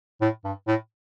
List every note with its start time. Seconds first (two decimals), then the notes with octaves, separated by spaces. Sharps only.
0.21 A2
0.45 G2
0.67 A2